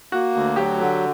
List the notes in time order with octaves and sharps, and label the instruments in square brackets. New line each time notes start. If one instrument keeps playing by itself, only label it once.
[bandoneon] A#3 [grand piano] F#4
[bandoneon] D2
[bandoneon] F#3 [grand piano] G4
[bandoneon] D3